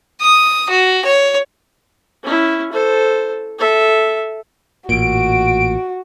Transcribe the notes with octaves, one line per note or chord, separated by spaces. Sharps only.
D#6
F#4
C#5
C#4 E4
A4 C5
A4 E5
A1 A#2 F#4 D7